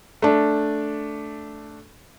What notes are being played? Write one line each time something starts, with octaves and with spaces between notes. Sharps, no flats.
A3 D4